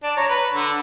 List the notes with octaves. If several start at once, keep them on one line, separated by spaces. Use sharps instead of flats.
D4
C#5 A#5
B4
D3